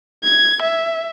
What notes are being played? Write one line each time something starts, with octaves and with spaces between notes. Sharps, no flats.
G#6
E5